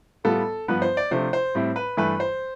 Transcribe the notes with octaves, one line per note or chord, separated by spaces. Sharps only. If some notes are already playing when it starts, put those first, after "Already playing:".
A2 G3 B3 F4 A4
G2 F3 B3 B4
C5
D5
C3 F3 A3 D4 C5
C5
A2 G3 C4 E4
B4
G2 E3 A3 E4 B4
C5